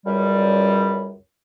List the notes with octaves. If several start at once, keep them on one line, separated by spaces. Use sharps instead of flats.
C#2 F#2 G3